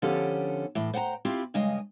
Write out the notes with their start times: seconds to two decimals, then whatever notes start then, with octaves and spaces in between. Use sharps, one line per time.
0.02 D3 F3 B3 C#4 G4 A4
0.75 A2 E3
0.94 C5 F#5 G5 A5 A#5
1.25 C4 E4 F4 G4
1.54 G2 C#3 G#3 D#5 G#5